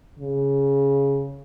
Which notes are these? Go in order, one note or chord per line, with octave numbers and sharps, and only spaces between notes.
C#3